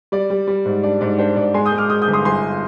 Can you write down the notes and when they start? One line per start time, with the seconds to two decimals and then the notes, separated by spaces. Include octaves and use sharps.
0.12 G3 D5
0.30 G3
0.48 G3
0.65 G#2
0.83 D4 D5
1.01 G#2 D5
1.19 D4 C5
1.36 G#2 D5
1.54 G#3 G#5 C6
1.66 D#6 G6
1.72 G#3
1.78 D6 F6
1.90 G#3 D#6 G6
2.02 D#6 G6
2.08 G1
2.13 C6 D#6
2.25 G1 G#5 C6